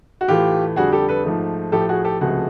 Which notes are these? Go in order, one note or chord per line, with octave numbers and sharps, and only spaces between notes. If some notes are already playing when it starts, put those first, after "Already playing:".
F#4
A2 E3 A3 F4 G4
F2 D3 G3 F#4 G#4
G4 A4
A4 B4
G#2 F3 A3
A2 F3 A3 G4 A4
F#4 G#4
G4 A4
C#2 C3 F3 A3 F#4 G#4